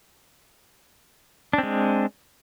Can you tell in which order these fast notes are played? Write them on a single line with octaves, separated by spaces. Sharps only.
D4 C4 G#3